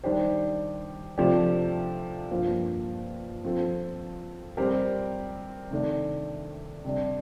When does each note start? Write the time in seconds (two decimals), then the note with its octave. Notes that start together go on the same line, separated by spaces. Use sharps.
0.04 D#3 G3 D4 G4 C5
1.18 C3 F3 A3 D4 G4
2.31 G2 F3 A#3 F4 C5
3.44 F3 C4 F4 A4
4.57 G3 C4 G4 A#4
5.71 C3 D#3 A3 D4
6.85 C3 G3 D4